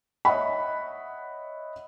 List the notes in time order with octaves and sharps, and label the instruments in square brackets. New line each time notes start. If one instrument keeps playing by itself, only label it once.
[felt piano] C#5 D#5 E5 F#5 B5